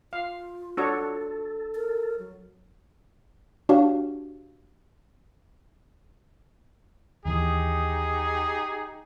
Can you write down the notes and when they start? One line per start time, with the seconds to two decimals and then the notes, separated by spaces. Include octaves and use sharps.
0.13 F4 F5
0.77 D4 F#4 A4 C#5
1.75 A#4
2.19 F#3
3.69 D4 F#4 G4 C#5 F5
7.25 D#2 E3 D#4 G4 G#4